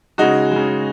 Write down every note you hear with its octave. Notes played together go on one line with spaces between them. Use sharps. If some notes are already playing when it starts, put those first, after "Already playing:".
C#3 G#3 D#4 F#4
C#3 G#3